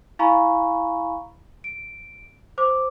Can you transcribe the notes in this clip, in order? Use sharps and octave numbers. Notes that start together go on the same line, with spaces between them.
E4 F5 G#5 A#5 B5 C#6
D7
C5 D6